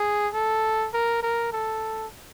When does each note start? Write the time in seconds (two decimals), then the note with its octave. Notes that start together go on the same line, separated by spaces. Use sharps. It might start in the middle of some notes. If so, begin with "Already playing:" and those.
Already playing: G#4
0.34 A4
0.93 A#4
1.23 A#4
1.53 A4